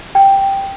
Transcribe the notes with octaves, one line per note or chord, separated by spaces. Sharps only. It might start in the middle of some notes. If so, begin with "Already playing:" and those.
G5